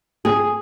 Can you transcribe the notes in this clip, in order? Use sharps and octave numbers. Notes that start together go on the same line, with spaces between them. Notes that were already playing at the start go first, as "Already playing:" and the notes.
G#4